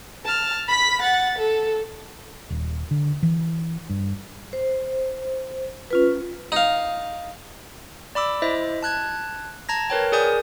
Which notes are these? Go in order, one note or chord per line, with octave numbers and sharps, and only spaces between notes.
A5 F6
B5 B6
F#5 A6
A4
D#1
D3
E3
G2
C5
C#4 F4 B4
D#4 F5
D5 B5 D6 E6
E4 C5 D#5 E5
A5 F#6 G#6
A5 A#5 G#6 A#6
A#4 B4 C#5 G5
G#4 A#4 D5 G#5 D#6 G6